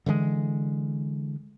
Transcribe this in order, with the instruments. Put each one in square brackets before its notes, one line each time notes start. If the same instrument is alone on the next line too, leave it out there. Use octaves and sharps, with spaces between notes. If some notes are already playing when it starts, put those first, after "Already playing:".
[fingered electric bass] D3 E3 G3 G#3